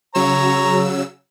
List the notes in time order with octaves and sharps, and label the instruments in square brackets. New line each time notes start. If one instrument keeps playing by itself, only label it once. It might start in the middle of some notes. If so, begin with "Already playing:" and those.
[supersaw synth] C#3 F#3 E6 [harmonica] C#5 A#5